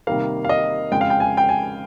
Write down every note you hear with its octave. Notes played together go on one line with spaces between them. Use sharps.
C3 D#3 G3 A#3 F5
F5
D#5
F2 C#3 G#3 G5
F5
G5
G#5
G5
G#5